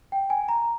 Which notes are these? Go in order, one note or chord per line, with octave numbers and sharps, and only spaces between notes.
G5
G#5
A#5